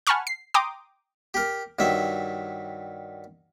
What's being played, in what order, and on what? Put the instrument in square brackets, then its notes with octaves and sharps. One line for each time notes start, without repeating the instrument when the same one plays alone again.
[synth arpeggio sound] F#5 G#5 A5 B5 C#6 F6
C7
G5 A#5 C6 D6 D#6
[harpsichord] G4 A#4
G2 D#3 F#3 E5